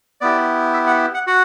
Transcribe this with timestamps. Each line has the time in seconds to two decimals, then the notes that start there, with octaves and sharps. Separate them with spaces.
0.21 B3 E4 G4 D5
0.74 E5
0.87 F#5
1.14 F#5
1.27 F#4 F#5